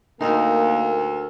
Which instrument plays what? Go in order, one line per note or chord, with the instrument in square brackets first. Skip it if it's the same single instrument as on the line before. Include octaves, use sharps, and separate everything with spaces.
[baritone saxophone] D2 [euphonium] A#3 [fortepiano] D#4 [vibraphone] A#4 E6